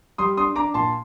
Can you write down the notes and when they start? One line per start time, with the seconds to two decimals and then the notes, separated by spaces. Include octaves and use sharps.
0.18 G3 C6 D#6
0.37 D4 C6 D#6
0.56 D4 A#5 D6
0.74 A#2 A5 C6